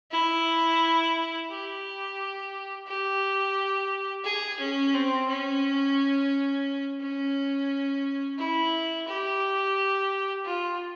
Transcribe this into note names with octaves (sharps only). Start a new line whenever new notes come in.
E4
G4
G4
G#4
C#4
C4
C#4
C#4
E4
G4
F4